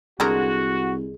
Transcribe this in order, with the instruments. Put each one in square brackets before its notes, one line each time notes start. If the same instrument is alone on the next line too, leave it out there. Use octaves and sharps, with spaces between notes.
[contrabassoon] C2 [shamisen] D3 G#3 A#4 [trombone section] F#4 [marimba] G#4